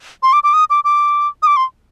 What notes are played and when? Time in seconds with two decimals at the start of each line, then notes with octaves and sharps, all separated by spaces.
0.23 C6
0.33 D6
0.44 D6
0.54 D#6
0.70 D6
0.84 D6
1.43 D#6
1.47 D6
1.57 C6